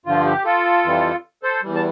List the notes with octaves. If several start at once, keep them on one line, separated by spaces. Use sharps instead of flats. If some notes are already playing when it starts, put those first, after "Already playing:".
G2 D3 F3 F4
G4
F4 A4
F2 E3 G3
A4 C5
E2 E3 G3
A5